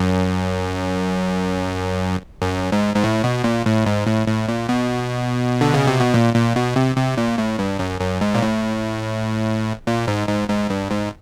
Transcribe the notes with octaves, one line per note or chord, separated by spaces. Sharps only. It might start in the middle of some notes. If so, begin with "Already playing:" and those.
Already playing: F#2
F#2
G#2
G#2
A2
B2
A#2
A2
G#2
A2
A2
A#2
B2
D3
C#3
C3
B2
A#2
A#2
B2
C3
C3
A#2
A2
G2
F#2
F#2
G#2
A#2
A2
A#2
G#2
G#2
G#2
G2
G#2